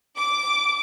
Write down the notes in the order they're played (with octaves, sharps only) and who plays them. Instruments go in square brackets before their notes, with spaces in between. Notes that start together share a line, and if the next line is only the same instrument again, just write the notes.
[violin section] D6